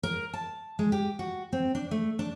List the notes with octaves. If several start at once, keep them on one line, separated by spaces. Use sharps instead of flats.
A#4
A5
G#3
G4
F#4
C4
D4
A3
D4